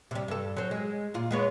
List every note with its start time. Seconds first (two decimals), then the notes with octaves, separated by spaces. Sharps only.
0.11 C3 G3
0.28 G2 A4
0.57 F#3 C4
0.71 G#3
1.14 A#2 F4
1.31 G#3 B3 C#5